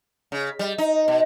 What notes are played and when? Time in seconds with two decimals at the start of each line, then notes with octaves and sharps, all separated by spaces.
0.32 C#3
0.59 G3
0.78 D#4
1.08 B2